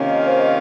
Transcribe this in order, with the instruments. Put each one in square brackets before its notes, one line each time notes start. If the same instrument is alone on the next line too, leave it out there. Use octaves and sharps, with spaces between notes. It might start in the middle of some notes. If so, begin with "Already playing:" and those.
Already playing: [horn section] C3 D#3 A#3 C#4 F4
[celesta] D#5
C5
D#5